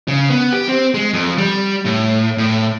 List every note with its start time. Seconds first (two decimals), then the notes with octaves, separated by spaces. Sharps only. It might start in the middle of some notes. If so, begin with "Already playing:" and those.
0.08 C#3
0.30 B3
0.53 G4
0.68 C4
0.94 G#3
1.13 F2
1.38 G3
1.85 A2
2.38 A2